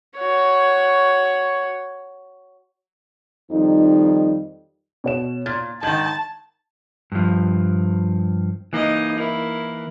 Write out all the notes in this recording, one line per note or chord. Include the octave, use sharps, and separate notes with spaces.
F#4 C#5
F2 D#3 G3 D#4
B2 C#5 E7
A#2 A6
G#2 D#3 A5 G#6 F#7
G2 F3
E3 A#3 D#4 D#5
E4 A#4